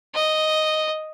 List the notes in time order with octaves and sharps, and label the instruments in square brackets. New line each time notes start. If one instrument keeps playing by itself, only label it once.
[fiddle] D#5